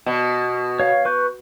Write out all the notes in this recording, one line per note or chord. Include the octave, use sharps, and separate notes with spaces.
B2
C#5 F5
B4 C#6 G6